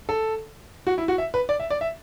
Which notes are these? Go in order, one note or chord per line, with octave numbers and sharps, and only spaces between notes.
A4
F#4
E4
F#4
E5
B4
D5
E5
D5
E5